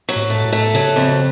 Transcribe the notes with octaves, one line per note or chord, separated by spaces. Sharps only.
F#3
A2
A3
A2
A3
C#3 F#3
F2